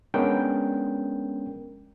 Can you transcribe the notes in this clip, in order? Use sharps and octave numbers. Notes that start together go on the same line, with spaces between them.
G#3 B3 C#4 D4 A#4 G5